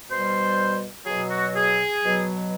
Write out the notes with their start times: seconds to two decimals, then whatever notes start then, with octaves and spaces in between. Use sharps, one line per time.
0.09 B2 G3 C5
1.06 B2 F#3 G#4
1.30 F#4
1.54 G#4
2.02 B2 F#3